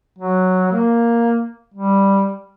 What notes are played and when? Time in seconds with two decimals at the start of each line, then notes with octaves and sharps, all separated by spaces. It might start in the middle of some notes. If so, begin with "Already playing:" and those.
0.19 F#3
0.72 A#3
1.74 G3